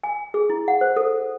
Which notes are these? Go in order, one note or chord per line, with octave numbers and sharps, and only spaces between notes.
G#5
G#4
E4
F#5
C5
A4